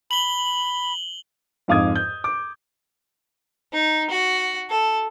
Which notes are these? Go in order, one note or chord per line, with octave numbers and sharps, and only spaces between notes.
B5 F#7 G7
F2 G#2 F5 D6 D#6 G#6
G6
D6
D#4
F#4
A4